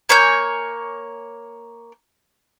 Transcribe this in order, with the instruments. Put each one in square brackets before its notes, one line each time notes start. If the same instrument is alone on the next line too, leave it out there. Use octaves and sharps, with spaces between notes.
[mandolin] A#3 C#5 G#5 G6